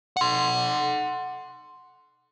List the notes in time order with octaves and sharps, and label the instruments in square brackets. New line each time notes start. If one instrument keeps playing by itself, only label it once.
[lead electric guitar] F#5 C6